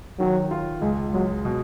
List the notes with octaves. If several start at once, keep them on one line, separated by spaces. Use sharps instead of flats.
D#3 F#3
F4
C#2 G#3
F#3 G#3
B2